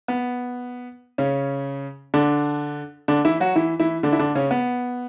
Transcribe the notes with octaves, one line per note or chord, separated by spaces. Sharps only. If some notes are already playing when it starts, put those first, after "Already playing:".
B3
C#3 C#4
D3 D4
D3 D4
E3 E4
F#3 F#4
E3 E4
E3 E4
D3 D4
E4
D3 D4
C#3 C#4
B3